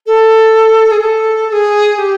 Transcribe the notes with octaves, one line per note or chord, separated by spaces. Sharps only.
A4
G#4
A4
A4
G#4
G#4
G4